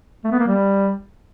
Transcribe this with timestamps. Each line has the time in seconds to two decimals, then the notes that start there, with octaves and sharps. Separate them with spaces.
0.24 A3
0.32 B3
0.39 A#3
0.47 G3